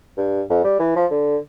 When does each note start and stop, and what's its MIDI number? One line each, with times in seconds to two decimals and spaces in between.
0.18 0.42 43
0.50 0.62 41
0.64 0.76 55
0.79 0.93 52
0.96 1.06 53
1.11 1.37 50